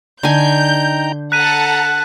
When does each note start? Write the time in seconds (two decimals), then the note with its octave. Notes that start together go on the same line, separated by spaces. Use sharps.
0.23 D3 D#4 G5 G#5 A#5 G6
1.32 A4 F#5 A5 A#5 F#6 B6 D#7